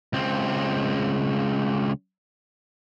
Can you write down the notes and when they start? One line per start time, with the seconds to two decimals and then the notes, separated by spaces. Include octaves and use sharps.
0.13 C#2 C4